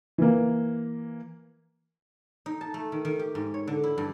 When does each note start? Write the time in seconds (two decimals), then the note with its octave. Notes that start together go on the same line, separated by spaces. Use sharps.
0.18 E3 A#3
2.46 D#4
2.61 A5
2.74 A3
2.92 D#3
3.05 D#3
3.19 G4
3.35 G#2
3.54 C#5
3.68 D3
3.83 E4
3.98 G2